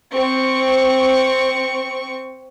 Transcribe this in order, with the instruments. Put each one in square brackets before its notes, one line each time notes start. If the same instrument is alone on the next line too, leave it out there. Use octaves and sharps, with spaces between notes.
[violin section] C4 C#6